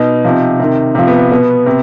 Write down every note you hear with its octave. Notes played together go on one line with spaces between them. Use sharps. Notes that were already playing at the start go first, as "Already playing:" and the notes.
Already playing: B2 D#4
C3 F3
C3 D#3
C3 F3
B3
B2 B3
C3